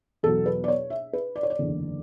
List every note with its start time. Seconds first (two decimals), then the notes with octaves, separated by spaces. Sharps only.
0.23 E2 B2 F#3 A4
0.46 B4
0.64 D5
0.68 C#5
0.90 E5
1.13 B4
1.36 D5
1.43 C#5
1.50 D5
1.59 F#1 E2 D3